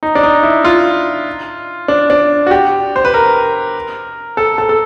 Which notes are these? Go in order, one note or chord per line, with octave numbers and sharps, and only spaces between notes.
D#4
D4
D#4
E4
F4
D4
D4
F#4
G4
C5
B4
A#4
A4
A4
A4